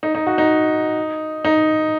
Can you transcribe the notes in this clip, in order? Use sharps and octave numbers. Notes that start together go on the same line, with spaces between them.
D#4
D#4
F#4
D#4
D#4